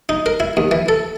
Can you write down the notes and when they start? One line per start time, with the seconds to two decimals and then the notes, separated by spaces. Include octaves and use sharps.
0.09 D#4
0.26 A#4
0.40 E4
0.57 D#2
0.71 E3
0.89 A4